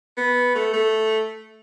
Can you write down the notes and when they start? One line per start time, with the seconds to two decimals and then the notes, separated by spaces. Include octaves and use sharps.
0.17 B3
0.55 A3
0.73 A3